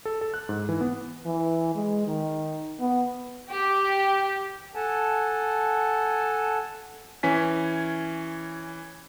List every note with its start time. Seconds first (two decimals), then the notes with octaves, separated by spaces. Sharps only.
0.05 A4
0.21 A4
0.34 F#6
0.49 G#2
0.69 E3
0.81 B3
1.26 E3
1.75 G#3
2.07 D#3
2.80 B3
3.51 G4
4.75 A4 F#5 G#5 A5
7.23 E3 C#4 G#5 B6